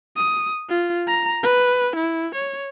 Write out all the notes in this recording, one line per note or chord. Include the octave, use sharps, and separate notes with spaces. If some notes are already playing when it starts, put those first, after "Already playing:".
D#6
F4
A#5
B4
E4
C#5